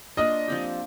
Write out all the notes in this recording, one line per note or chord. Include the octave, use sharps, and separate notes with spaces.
A#3 D4 F4 D#5
F3 C4 G4